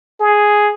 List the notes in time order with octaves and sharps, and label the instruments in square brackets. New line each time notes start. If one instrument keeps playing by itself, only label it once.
[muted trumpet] G#4